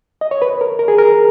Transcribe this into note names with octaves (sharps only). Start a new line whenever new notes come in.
D#5
C#5
B4
A#4
A#4
G#4
A#4